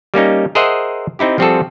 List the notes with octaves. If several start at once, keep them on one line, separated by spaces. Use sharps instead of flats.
G3 A#3 C#4 D#4
G#4 A#4 C5 D#5 E5 F#5
C4 D#4 E4 G4
F3 G3 C4 F#4 G#4 A4